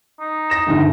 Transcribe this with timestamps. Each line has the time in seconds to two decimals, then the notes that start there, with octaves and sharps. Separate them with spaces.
0.20 D#4
0.50 A#6 E7
0.67 G1 D2 G#2